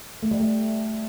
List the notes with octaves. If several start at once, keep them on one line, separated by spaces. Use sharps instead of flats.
A3
G3
A3